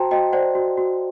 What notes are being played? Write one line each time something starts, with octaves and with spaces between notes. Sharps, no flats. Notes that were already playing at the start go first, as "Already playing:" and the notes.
Already playing: F#4 C5 G5 A5 A#5 C6
F#4 D#5 G5
C5 D5 F#5
F#4
F#4